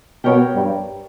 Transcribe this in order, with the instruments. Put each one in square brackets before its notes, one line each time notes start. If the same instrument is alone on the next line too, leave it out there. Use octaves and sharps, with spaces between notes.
[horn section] B2 B3 [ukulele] G4 A#4 C#5
[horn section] G2 G3